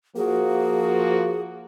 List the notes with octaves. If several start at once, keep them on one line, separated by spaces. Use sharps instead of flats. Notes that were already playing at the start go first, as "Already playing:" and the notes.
F3 A#3 F#4 G#4